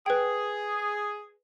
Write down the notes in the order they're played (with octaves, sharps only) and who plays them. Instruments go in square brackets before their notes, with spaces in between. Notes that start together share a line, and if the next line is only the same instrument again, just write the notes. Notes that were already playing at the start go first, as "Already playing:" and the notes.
[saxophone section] G#4 [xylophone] B4 G5